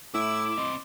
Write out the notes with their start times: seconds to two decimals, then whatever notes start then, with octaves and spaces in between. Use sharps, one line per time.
0.14 A2 E4 D6 E6
0.58 C4 D#5 C6